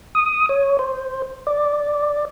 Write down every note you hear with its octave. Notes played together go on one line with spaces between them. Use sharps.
D#6
C#5
C5
D5